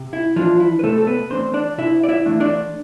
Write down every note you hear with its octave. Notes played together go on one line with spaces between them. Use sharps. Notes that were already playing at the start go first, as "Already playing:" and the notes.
Already playing: C3
E4
E3 F3 A3 D4 F4
E4
B4
C3 A3 A4
A4
B3 B4
E3 A3 C4 D4 C5
D4 D5
C3 E4 E5
D5
E4 E5
E3 A3 D4
D4 D5